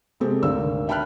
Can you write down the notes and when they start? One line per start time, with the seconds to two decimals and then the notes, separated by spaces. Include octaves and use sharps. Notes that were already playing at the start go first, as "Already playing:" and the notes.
0.20 C3 G#3 C4 G4 A4
0.42 G#1 D2 A#4 E6
0.88 E5 G5 A5 B5 F6 F#6